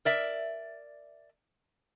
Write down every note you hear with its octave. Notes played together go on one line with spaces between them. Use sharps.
A#4 D5 E5